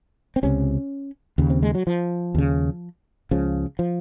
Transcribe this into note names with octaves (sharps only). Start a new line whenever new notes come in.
C4
C#2 C3 C#4
D#2 C#3
C4
G#3
F#3
F3
D#2 C#3
C#2 C#3 F3
F3